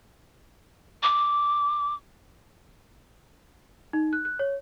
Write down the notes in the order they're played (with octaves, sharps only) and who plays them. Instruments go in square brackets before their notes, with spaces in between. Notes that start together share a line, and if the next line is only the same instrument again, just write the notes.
[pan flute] D6
[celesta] D#4
F#6
F#6
C#5